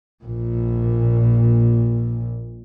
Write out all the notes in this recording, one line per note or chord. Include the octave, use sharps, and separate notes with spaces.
A#1 A#2